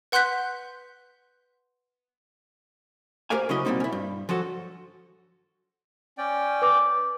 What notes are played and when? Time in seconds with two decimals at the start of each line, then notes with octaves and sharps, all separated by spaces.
0.12 B4 F#5 C6 F#6 G6 B6
3.30 G4 A#4 C5 D5 F5 G#5
3.49 C#3 F#3 C#4 E4 D#5
3.65 B2 G3 A3 A#3 C4 D#4
3.80 C#4 E4
3.92 G2
4.29 F3 F#3 F#4 A4
6.18 C#4 D5 G5
6.62 B4 D6